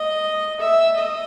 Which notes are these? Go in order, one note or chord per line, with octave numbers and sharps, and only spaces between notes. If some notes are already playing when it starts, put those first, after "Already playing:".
Already playing: D#5
E5
D#5